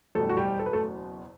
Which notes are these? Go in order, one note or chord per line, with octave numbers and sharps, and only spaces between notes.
F#1 E2 B2 G3 A3 A4
F#4
G3 G4
A4
B4
A3 A4